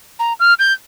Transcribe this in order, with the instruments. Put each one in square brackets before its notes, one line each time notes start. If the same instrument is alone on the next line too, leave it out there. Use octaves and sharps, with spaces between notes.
[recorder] A#5
F6
G6